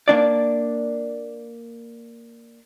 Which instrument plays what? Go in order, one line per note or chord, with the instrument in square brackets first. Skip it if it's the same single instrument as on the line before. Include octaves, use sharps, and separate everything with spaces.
[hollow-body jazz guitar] A#3 D4 D5